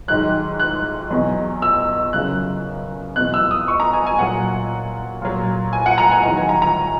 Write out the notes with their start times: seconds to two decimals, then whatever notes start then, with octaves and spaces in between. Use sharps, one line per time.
0.08 G#2 D#3 F#3 F#6
0.60 F#6
1.11 E2 B2 F#3
1.62 E6
2.13 F#2 C#3 F#3 F#6
3.16 E2 B2 F#3 F#6
3.34 E6
3.51 D#6
3.68 C#6
3.80 A#5
3.93 G#5
4.06 G#5
4.18 A#2 F#3 F#5
5.22 A#2 F#3
5.73 G#5
5.86 F#5
5.98 A#5
6.11 G#5
6.23 E2 D#3 F#3 F#5
6.37 G#5
6.49 A#5
6.62 A#5